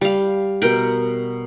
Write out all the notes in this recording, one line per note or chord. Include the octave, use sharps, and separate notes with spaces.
G3 F5
B2 A#4 G5